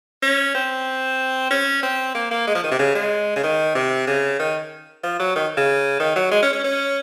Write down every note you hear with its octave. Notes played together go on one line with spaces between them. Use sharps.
C#4
C4
C#4
C4
A#3
A#3
G#3
F3
D#3
C3
C#3
G#3
C#3
D#3
C3
C#3
D#3
F3
F#3
D#3
C#3
D#3
F#3
G#3
C#4
C#4
C#4